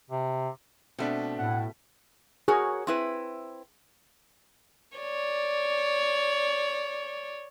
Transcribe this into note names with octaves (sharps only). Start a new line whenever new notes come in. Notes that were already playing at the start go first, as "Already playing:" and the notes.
C3
B2 A3 C4 D4
A2 F#5
F#4 G#4 A#4 C#5
C4 E4 B4
C#5 D5